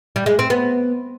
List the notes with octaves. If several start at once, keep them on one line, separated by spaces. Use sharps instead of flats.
G3
G#3
C4
B3